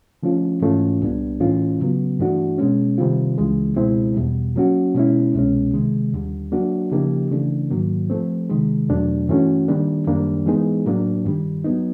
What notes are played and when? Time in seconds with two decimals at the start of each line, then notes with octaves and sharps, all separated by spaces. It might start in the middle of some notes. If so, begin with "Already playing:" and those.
0.23 D3 F3 A3 C#4 F4
0.61 G#2 E3 A3 C#4 F4
1.01 C2 A#2 G3 B3 D4
1.40 A2 E3 A3 C#4 F4
1.80 C#3 F#3 B3
2.19 G2 E3 A3 D4 F#4
2.58 B2 G#3 C#4
2.98 C3 D#3 G3 C4 F4
3.38 C#2 C#3 E3 G#3
3.76 C#2 B2 G#3 C4 E4
4.16 E2 B2 G3
4.56 F#3 A#3 C#4 F#4
4.95 B2 G#3 C#4 E4
5.34 C2 B2 G#3 C#4
5.74 C3 D#3 G#3
6.13 D#2 D3 G3
6.52 F#3 A#3 D4 F#4
6.92 C#3 F3 A#3 D#4 G4
7.31 C#3 E3 A3 D4
7.70 G#2 D#3 F#3 A#3
8.10 F3 A3 C4
8.49 C3 D#3 G#3
8.89 E2 B2 F#3 A3 D4
9.28 G2 E3 A3 C#4 F#4
9.68 D#3 G3 A#3 D4
10.07 F#2 D#3 G3 A#3 D4
10.46 E3 G#3 B3 D#4 G#4
10.86 A2 F#3 A#3 D4
11.25 G2 D#3 G3
11.64 F#3 B3 D#4